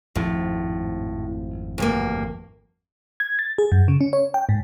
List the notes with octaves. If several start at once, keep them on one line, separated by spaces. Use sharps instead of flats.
G#1 F2 A2 F3
D2 G2 A#3
G#6
A6
G#4
F#2
C#3
C#4
C#5
G5
G#2